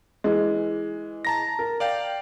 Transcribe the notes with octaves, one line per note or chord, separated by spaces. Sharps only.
E3 G#3
A5 A#5 A#6
A#4
D5 F5 G5